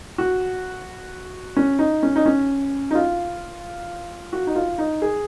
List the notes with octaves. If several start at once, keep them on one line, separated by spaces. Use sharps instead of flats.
F#4
C#4
D#4
C#4
D#4
C#4
D#4
F4
F#4
D#4
F4
D#4
G#4